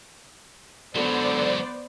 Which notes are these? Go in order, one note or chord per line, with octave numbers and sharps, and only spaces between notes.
C#2 D3 F#3 B3 C5 D5